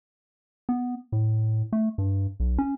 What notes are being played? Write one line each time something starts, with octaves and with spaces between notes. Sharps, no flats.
B3
A2
A3
G2
B1
C#4